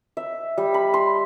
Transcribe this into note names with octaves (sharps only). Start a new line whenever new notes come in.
E5
G3
B5
C6